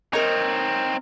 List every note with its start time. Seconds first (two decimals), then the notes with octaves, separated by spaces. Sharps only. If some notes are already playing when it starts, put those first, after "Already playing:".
0.13 C4 D#4 A#4 C#5